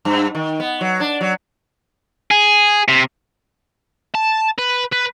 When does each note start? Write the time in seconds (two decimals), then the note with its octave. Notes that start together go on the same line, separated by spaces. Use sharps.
0.05 G2
0.35 D#3
0.60 B3
0.81 F#3
1.00 D4
1.21 F#3
2.31 G#4
2.88 C3
4.15 A5
4.59 B4
4.93 B4